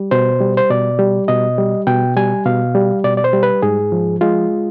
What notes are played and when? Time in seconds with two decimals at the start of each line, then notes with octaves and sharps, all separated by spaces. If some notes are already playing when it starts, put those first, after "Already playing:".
Already playing: G3
0.11 B2 C5
0.41 G3
0.57 C5
0.70 B2 D5
0.99 G3
1.28 B2 D#5
1.58 G3
1.87 B2 G5
2.17 G3 G#5
2.46 B2 F5
2.75 G3
3.04 B2 D5
3.17 D5
3.24 C5
3.33 G3
3.43 B4
3.62 G#2 G#4
3.92 F3
4.21 G#3 F4